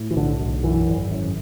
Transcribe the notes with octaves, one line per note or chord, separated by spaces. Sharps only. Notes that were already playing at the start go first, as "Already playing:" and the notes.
Already playing: A2
E3
B1 D3
B1
F#2 E3
G#1
F#2